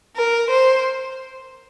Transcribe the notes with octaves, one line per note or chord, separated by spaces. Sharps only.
A#4
C5